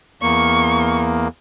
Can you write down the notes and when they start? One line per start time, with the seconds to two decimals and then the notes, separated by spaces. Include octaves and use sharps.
0.22 E2 A#3 C#6